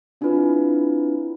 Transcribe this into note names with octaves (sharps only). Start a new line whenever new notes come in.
C4 D4 E4 F4 B4